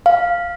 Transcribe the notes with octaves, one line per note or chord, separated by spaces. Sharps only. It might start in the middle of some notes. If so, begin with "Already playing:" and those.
F5